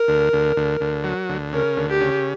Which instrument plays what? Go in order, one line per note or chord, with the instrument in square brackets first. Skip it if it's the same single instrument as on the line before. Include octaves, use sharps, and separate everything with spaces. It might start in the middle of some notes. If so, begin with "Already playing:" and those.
Already playing: [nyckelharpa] A#4
[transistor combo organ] D2
D2
D2
D2
F#3
D2
[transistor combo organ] C#3 [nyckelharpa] A#4
[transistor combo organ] D2
[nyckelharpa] G4
[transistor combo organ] C#3